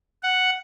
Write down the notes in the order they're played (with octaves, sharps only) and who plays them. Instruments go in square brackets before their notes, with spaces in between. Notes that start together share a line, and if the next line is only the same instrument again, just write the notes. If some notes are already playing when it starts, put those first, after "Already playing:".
[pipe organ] F#5